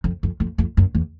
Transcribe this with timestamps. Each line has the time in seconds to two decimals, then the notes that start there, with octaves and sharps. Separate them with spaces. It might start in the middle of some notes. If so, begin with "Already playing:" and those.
0.04 F2
0.23 F2
0.40 F2
0.58 F2
0.77 F#2
0.95 E2